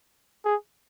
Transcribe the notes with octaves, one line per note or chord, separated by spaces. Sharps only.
G#4